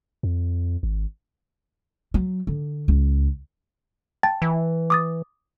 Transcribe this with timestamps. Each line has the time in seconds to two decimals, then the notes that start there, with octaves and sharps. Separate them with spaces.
0.23 F2
0.83 G#1
2.14 F#3
2.47 D3
2.88 C#2
4.23 G5 A5 A6
4.42 E3
4.90 D6 D#6 A6